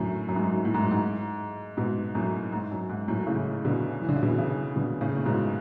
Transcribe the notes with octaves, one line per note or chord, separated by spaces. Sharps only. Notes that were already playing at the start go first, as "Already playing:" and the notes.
Already playing: F#2 A2 D3
F#2
G#2
F#2
A2
G#2
F#2
G#2
G#2 B2
F#2 A2
G#2
F#2
G#2
F#2 A2
A2 C#3
B2 D3
E3
D3
C#3
B2 D3
C#3 E3
B2 D3
A2 C#3
A2
G#2 B2